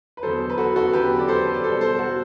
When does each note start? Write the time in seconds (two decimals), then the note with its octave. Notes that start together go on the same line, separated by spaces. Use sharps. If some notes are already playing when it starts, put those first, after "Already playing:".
0.17 B4
0.23 E2 D3 F#3 A4 C5
0.50 B4
0.58 F#4 A4
0.76 F#4 A4
0.93 E2 D3 F#3 G4 B4
1.19 D5
1.28 A4 C5
1.54 D5
1.64 B2 G3 A4 C5
1.81 A4 C5
1.99 F#4 A4